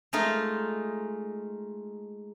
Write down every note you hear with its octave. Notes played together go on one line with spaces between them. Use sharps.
G#3 A3 D#4 F4